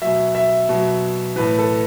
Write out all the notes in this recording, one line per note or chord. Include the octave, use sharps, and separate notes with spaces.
B2 F#3 E5
E5
B2 F#3
A2 E3 B4
A4